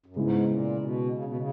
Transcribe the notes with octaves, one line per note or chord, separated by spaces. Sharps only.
F#2
G#2 C#3 G#3 B3 E4
A#2
B2
C#3
B2
C#3